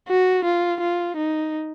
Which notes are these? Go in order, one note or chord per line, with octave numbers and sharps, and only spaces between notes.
F#4
F4
F4
D#4